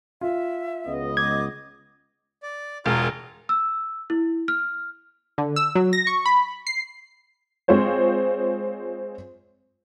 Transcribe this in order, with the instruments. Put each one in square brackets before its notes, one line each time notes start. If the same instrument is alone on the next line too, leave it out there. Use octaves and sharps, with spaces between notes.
[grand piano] F4 [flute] E5
[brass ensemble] C#2 B3 D#5
[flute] D6 [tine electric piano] G#6
[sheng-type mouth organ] D5
[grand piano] E1 [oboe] F4 [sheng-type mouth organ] G#4 A#4
[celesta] E6
E4
F6
[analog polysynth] D3
E6
F#3
A#6
C#6
B5
C7
[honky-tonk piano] G#3 C4 F4 C5 C#5